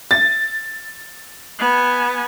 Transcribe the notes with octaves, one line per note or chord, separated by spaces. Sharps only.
A6
B3 G#5